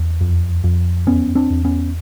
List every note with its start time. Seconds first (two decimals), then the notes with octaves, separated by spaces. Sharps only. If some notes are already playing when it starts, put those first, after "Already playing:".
Already playing: E2
0.21 F2
0.64 F2
1.07 E2 B3 C#4
1.35 C4 D4
1.50 E2
1.65 B3 C#4